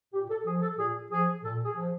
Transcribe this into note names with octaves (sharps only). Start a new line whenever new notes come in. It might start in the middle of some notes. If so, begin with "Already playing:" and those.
A#2 G4
A4
F3 G#4
A4
A#2 G#4
F3 G#4
A#2 A4
G#4
F3